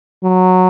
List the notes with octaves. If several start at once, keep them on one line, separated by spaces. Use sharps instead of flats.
F#3